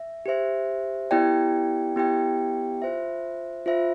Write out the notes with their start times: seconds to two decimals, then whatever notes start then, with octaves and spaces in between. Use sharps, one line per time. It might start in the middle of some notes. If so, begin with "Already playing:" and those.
Already playing: E5
0.26 G4 C5 E5
1.11 B3 E4 G4 D5 G5
1.96 B3 E4 G4 D5 G5
2.82 F4 C5 E5
3.66 F4 C5 E5